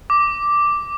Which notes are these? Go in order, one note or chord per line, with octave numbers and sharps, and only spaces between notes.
D6